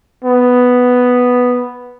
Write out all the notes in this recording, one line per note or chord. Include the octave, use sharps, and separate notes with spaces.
B3